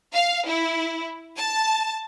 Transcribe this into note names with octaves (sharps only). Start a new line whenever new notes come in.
F5
E4
A5